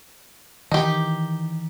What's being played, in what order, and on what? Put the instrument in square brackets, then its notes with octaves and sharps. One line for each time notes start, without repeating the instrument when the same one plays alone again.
[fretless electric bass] D#3 E3 [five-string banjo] D#4 G4